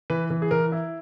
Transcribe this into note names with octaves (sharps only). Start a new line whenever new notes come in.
E3 B4
E3
G#4
E3 A#4
E4